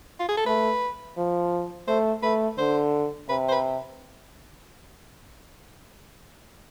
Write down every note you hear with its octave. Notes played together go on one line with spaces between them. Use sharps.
F4
G#4
A4
A3 B4
F3
A3 C5
A3 B4
D3 C5
C3 B4
C5
B4